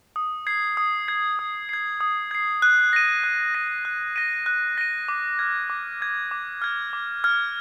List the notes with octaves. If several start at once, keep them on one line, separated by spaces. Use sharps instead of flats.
D#6
G#6 C7
D#6
G#6 C7
D#6
G#6 C7
D#6
G#6 C7
F#6
A#6 D#7
F#6
A#6 D#7
F#6
A#6 D#7
F#6
A#6 D#7
D6
F6 G#6
D6
F6 G#6
D6
F6 G#6
D6
F6 G#6